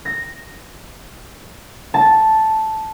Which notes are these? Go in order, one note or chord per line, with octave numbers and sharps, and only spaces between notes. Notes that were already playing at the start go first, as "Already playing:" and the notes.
A#6
A5